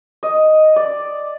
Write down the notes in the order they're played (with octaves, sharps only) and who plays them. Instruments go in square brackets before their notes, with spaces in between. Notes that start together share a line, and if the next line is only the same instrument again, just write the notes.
[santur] D#5
D5